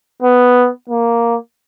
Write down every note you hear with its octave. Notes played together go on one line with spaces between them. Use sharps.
B3
A#3